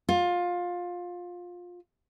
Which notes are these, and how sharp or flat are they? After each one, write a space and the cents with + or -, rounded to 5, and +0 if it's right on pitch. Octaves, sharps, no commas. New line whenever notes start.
F4 +20